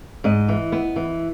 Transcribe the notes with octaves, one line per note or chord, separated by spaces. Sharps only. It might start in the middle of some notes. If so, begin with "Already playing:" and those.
G#2 D#5
E3
B3
E3